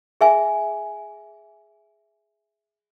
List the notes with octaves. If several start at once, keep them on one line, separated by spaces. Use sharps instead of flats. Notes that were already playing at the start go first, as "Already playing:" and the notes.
G#4 E5 G#5